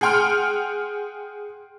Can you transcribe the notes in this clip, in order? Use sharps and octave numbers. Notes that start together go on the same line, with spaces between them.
G#4 F#5 G5 C6 F6